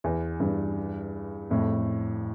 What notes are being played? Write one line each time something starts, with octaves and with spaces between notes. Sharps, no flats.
E2
E2 G2
F2 A2